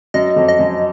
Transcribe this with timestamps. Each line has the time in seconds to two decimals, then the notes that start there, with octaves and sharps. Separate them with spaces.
0.14 F#2 D#5
0.36 F2
0.48 D#5
0.59 F#2